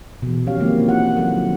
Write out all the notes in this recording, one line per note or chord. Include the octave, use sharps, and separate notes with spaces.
B2 E3
F3 C#4 G4 C#5 F5
D#3 F3 G#3 A#3 C4 E4
F4 F#4 F#5
D#3 F3 F#3 A4 F#5
D#3